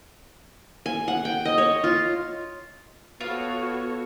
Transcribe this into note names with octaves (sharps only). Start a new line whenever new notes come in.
G#5
F#5
G5
D#5
C#5
F4
B3 F4 F#4 A4 C#5